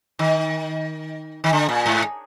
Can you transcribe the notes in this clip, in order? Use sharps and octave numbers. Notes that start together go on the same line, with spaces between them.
D#3
D#3
D3
A#2
G#2